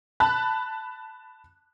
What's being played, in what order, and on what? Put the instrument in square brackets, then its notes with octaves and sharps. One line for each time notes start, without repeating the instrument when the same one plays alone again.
[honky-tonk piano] A5 B5 F#6